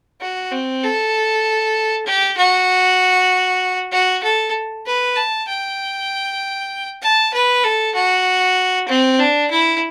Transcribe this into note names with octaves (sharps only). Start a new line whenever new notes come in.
F#4
C4
A4
G4
F#4
F#4
A4
B4
A5
G5
A5
B4
A4
F#4
C4
D4
E4